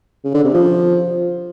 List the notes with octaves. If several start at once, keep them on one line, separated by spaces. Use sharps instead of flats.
C#3
D3
C3
F3